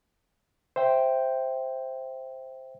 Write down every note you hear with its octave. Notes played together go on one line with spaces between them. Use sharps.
C5 E5 G5